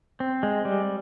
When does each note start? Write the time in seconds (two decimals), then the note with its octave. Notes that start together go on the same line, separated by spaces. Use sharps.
0.20 C4
0.43 G#3
0.65 G3